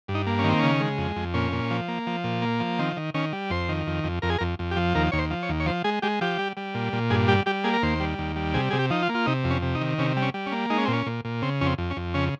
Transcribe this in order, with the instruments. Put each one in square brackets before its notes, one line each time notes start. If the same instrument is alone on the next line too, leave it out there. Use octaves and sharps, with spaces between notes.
[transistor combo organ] G2
D#4
A#3
C#4
D#3 C4
C#3 C#4
G#3
F2
F2
A#2 C#4
A#2
F3
A#3
F3
A#2
A#3
F3
D#3 C4
D#3
D#3 C#4
G3
F2 C5
D#3
F2
F2
F2 A#4
G#4
F2 A#4
F2
G4
F3
D#2 A#4
D#2 C#5
C5
F3
C#5
D#2
C#5
F3 C5
G#3 G#4
G#3 G4
F3 G4
G3
G3
A#2
A#2
G2 G#4
G3 G4
G3 G4
A#3 G#4
A#4
D#2 C5
G3
D#2
G3
C3 G#4
C3 G#4
G4
F3 D#4
F4
A#3
F4
C3 D#4
F2
C#4
C3
D#4
D#3
C3 C#4
G3
C#4
G3
C#4
A#3
G#3 D#4
C#4
C4
A#2
C#4
A#2
A#2
C#3 C4
F2 C#4
C4
F2
C#4
F2
C#3 C#4